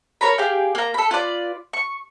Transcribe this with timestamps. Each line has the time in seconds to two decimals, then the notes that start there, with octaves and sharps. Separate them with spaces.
0.21 A#4 C#5 A#5 B5
0.38 G4 G#4 F5 G5
0.75 A#3 A#5
0.94 A4 B5
1.11 F4 B4 D5
1.73 C#6